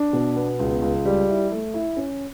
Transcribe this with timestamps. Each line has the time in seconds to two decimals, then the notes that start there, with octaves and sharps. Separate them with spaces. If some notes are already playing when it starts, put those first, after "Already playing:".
Already playing: D4
0.13 B2
0.36 B3
0.59 C#2
0.82 C#2
1.05 G3
1.29 E4
1.52 A3
1.74 E4
1.97 C#4